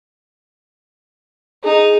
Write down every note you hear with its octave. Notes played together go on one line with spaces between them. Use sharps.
D#4 G#4